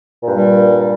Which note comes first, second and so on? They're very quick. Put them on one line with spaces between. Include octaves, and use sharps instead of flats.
A#2 G2 G3